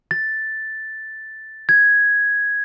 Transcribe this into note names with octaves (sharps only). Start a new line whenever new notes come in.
A6
G#6